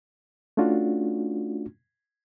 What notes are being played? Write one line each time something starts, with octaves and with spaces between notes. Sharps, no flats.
A3 C#4 D4 F4 F#4